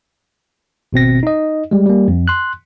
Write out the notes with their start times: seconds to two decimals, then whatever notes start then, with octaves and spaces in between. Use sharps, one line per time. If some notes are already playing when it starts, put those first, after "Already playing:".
0.93 G#1 B2 C4 A#6
1.23 D#4 D#5
1.71 G3 G#3
1.86 G3 A#3
2.08 F2
2.28 C6 F#6